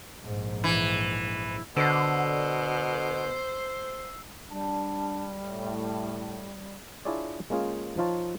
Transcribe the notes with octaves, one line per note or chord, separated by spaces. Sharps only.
A#1 G#2
E3
B2 D3 C5 E6 C7
G3 D4 A5
A2
D4 E4 F4 G#4 C#5 D5
G#3 A#3 C#4 F4 G#4
F3 D#4 F4 C#5 A5